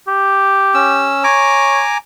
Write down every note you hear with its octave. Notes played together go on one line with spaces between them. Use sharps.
G4
C#4 E6
C#5 G#5 A#5 D6